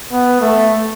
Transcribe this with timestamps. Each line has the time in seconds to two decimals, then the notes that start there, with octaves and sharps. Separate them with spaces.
0.12 B3
0.40 A3